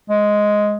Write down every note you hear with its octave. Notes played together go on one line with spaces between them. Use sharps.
G#3